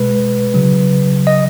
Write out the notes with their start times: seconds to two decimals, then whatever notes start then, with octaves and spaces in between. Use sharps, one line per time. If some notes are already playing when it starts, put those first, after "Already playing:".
Already playing: B2 G#3 B4
0.54 C#3 F#3
1.27 D#5